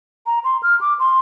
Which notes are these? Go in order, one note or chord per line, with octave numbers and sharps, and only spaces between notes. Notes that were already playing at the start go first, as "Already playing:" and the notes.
A#5
C6
F6
D6
C6